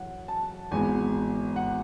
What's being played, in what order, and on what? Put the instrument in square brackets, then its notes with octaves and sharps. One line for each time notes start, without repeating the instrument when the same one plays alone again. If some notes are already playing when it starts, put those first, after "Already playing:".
Already playing: [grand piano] F#2 E3 F#5
A5
G#1 G#2 E3 G#3 B3 G#5
F#5